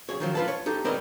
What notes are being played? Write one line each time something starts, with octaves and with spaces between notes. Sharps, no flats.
B1 G#4 C#5
D#3 F3 F#3
F4 B4 A5
C#5
D#4 G4 A4
G#3 C4 A#4 B4 D5 D#5